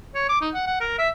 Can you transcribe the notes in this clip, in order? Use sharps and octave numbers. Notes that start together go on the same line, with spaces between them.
C#5
D6
D#4
F#5
F#5
A#4
E5